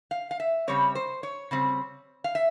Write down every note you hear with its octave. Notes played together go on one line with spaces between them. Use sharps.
F5
F5
E5
C#3 G3 C4 C#5
C5
C#5
C#3 G3 C4
F5
E5